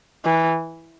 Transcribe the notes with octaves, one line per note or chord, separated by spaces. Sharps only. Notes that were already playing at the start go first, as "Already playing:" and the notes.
E3